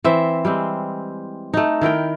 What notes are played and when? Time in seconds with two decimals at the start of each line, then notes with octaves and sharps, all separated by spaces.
0.04 E3 C4 C5 E5
0.45 G3 G#3 C4
1.54 A3 D#4
1.81 D#3 E4 A#4 G5